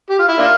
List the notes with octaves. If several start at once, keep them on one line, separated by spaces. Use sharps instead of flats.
G4
F4
E4
A#3 D4 F4